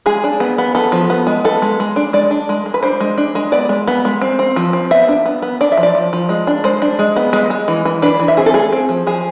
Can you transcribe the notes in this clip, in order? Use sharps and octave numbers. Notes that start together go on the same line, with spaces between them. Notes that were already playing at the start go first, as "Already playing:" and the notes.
G#3 G#4
D4
B3
B3
B3 A4
F3
B3
G#3
B3 A4
G#3
G#3
D4
G#3 D5
D4
G#3
G#3
B4
D4 C5
G#3
D4
G#3
B3 D5
G#3
B3
G#3
C4
C4
F3
C4
B3 E5
D4
B3
B3
D4 D5
E5
F3
D5
F3
F3
G#3
D4
G#3 C5
D4
G#3
B3
G#3
G#3
E3
E3
D4 B4
E3
E5
C4 G#4
A4
A3 G#4
C4
F3
F3 G#4